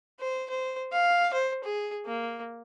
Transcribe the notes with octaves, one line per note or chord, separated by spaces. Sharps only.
C5
C5
F5
C5
G#4
A#3